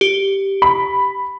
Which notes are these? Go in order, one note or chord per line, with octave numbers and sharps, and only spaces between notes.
G4
B5